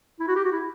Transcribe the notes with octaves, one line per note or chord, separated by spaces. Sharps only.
E4
F#4
G4
F#4
E4